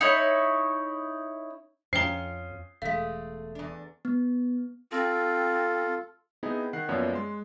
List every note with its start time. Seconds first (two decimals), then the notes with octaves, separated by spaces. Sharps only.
0.01 D#4 E4 C#5
1.93 F2 C#4 F4 C5 G5 A#5 C7 G7
2.82 E1 G#3 A3 F5 B6
3.55 E2 D4
4.05 B3
4.92 C4 F4 A4
6.43 B3 C4 D#4 E4 G#4
6.73 D#3 F#5 F#6 C7
6.89 F#2 F3 A#3 B3 C#5 D5
7.13 G#3 C6